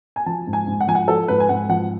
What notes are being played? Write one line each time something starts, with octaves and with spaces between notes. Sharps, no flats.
G#5
F3 A5
G#2
G#5
G#2
F#5
F3 G#5
F#5
F3 A4
G#2 B4
G#5
G#2 F#5
F3 F#5